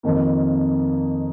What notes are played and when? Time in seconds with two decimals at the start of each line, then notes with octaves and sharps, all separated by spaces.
0.03 F2 D#3 A#3